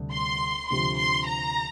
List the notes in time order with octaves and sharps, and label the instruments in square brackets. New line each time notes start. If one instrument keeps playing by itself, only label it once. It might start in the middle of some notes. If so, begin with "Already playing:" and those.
Already playing: [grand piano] D2 C3 G3 D4
[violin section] C6
[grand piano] D2 C3 F3 [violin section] C6
[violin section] C6
A#5